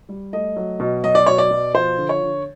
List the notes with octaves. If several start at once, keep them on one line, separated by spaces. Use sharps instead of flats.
G3
A3 D#5
F#3
B2
F#3 D#5
D5
B2 C#5
D5
B2
F3 C5
D3
C#5
D3